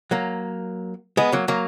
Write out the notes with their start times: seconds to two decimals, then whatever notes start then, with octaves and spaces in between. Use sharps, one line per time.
0.11 F#3 A#3
1.17 G#3 B3
1.32 F#3 A#3
1.48 F#3 A#3